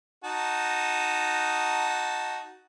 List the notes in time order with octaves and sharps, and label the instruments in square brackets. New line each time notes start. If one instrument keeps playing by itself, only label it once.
[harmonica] D#4 F#4 A5